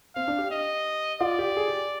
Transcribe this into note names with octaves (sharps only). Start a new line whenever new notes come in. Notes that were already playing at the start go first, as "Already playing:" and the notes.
C4 F5
D4
G4
D#5
F4 D5
G4
G#4
G4